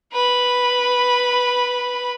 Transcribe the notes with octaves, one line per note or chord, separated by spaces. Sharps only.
B4 B5